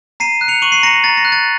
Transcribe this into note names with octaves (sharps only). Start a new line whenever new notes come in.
A#5 C7 D#7
F#6
C#7 F7
C#6 D#7 F#7
C7 D#7
A#5 A#6 C#7
A#6
A#5 A6
A#6
F#6
A6